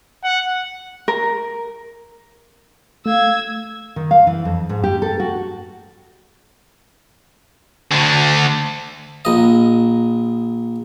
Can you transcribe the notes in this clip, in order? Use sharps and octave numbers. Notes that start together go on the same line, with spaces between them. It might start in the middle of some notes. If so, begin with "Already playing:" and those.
F#5
A#4
A3 F5 E6 G#6
D#3
F5
E3
F2
G#2
G4
A4
F#4
D2 D3
A#1 D#5